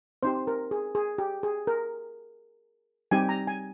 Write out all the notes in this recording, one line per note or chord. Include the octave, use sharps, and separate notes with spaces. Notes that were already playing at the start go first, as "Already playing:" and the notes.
C4 D#4 G4 C5
A#4
G#4
G#4
G4
G#4
A#4
G3 C4 D#4 G4 G#5
A#5
G#5